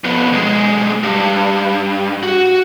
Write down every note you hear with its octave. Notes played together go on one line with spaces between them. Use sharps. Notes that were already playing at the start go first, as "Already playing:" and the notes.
F2 B3
B1 G#3
G2
F#4